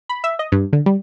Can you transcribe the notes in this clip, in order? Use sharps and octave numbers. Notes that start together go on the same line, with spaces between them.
B5
E5
D#5
G2
D3
G3